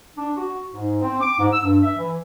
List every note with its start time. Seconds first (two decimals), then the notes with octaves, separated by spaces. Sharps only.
0.17 D4
0.35 F#4
0.72 G#2
1.02 C4
1.21 D6
1.39 G#2
1.52 E6
1.64 G2
1.82 E5
1.97 E3